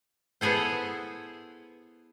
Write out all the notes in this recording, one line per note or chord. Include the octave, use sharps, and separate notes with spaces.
B3 E4 G#4 A4 C5